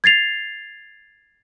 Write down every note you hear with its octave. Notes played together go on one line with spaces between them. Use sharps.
G#6 A6 C7 F7